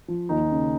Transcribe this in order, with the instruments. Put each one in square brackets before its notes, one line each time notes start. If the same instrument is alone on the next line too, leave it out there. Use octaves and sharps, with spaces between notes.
[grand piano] F3
D#2 D#4
C#3